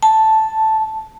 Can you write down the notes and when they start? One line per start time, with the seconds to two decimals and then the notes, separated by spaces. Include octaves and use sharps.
0.03 A5